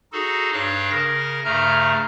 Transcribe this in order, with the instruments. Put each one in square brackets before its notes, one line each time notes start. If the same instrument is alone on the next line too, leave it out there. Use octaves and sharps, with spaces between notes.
[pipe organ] D#4 F#4 G#4 A4
G2 D4 C#5 F5 F#6
C#3 A#4 A#6
G2 C#3 A3 A#5 F6